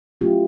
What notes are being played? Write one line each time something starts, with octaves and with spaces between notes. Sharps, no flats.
F#3 A3 C#4 E4 F4 G4